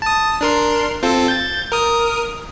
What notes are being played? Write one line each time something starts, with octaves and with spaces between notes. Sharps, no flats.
A5 D#6
D4 A#4 C6
C4 F4 A4
G6 A6
A#4 D#6